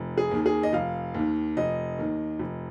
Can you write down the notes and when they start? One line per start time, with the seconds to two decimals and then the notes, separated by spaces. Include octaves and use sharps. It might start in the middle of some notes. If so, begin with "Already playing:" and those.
Already playing: F1
0.17 G#4
0.31 D#2 D#3
0.46 G#4
0.63 D#5
0.73 F1 F5
1.14 D#2 D#3
1.57 F1 D#5
1.98 D#2 D#3
2.39 F1